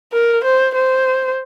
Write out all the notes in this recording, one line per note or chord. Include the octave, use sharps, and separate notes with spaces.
A#4
C5
C5